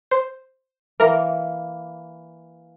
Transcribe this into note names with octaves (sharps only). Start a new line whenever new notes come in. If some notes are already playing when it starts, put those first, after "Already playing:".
C5
E3 A#3 A#4 A#5